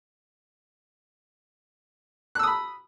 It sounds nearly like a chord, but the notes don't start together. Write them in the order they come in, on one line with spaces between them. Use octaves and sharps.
F#6 E6 D#6 B5